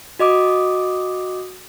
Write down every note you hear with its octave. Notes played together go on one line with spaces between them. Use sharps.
F#4 D#5 D6 D#6